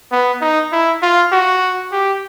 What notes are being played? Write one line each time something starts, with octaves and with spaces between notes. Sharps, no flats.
B3
D#4
E4
F4
F#4
G4